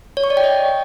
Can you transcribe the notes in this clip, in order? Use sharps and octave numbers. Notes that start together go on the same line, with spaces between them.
C#5
C#6
D5
G5
D#5